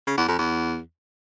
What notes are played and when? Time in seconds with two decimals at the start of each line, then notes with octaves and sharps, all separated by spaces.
0.07 C#3
0.17 E2
0.28 F2
0.38 E2